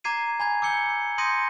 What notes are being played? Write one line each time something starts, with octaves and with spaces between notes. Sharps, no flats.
A#5 D6 G#6 C7 D#7
G#5 B5 G#6
D6 E6 G6 C#7 G7
C6 D#6 G6 A#6 C#7 D#7